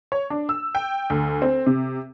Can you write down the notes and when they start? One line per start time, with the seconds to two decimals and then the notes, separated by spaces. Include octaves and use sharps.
0.12 C#5
0.30 D4
0.49 E6
0.75 G5
1.10 D2
1.42 C4
1.66 C3